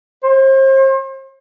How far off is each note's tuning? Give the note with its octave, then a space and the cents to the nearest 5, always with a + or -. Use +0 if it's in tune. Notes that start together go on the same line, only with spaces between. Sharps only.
C5 +40